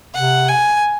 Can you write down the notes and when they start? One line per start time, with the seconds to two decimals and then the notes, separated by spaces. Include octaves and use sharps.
0.14 C3 F#5
0.48 G#5